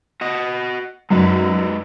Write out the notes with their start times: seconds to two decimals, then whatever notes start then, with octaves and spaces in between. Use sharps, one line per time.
0.21 F#4 D#5
1.11 F#2 G#3 D#4 B4